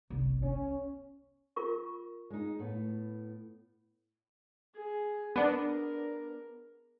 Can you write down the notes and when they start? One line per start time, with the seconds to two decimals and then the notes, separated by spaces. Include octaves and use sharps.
0.10 G1 C2
0.43 B3 C#4
1.56 F4 A#4 C#6
2.30 G#3 D#4
2.59 A2 B3
4.75 G#4
5.36 B3 D4 A#4